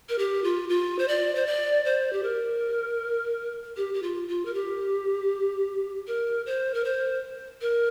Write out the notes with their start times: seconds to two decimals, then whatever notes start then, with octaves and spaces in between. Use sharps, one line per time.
0.09 A#4
0.18 G4
0.44 F4
0.69 F4
0.99 C5
1.08 D5
1.35 C5
1.47 D5
1.85 C5
2.13 G4
2.23 A#4
3.77 G4
3.94 G4
4.03 F4
4.28 F4
4.45 A#4
4.54 G4
6.07 A#4
6.46 C5
6.74 A#4
6.84 C5
7.61 A#4